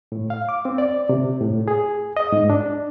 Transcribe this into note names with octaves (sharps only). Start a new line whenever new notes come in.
A2
F5
D6
C4
D5
C3
A2
G#4
D#5
G#2
D4